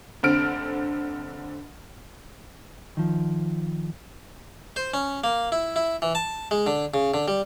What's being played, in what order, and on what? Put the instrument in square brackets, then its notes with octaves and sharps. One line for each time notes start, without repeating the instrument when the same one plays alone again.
[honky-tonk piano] F1 D3 C4 F6 D7
[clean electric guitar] D#3 F3
[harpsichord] C5
C#4
A#3
E4
E4
E3
A5
G#3
D3
C#3
D3
G3